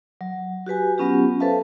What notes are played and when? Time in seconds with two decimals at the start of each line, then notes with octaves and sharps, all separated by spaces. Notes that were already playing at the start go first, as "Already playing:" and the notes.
0.21 F#3
0.66 F#4 G4 B4 G#5
0.98 F#3 B3 C#4 F4 G4
1.40 A4 B4 C5 E5 F5 A5